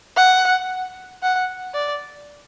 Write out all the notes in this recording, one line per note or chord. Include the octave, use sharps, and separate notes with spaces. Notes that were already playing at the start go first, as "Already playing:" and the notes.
F#5
F#5
D5